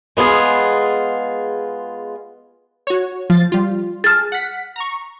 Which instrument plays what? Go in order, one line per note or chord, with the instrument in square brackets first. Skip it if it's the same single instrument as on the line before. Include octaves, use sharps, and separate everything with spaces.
[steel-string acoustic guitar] G#3 B3 F4 G#4
[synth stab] F#4 C#5
F3 A6
G3 F4
[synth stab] G#4 A5 [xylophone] F6 A6
[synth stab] F#5 B6
A#5 C#6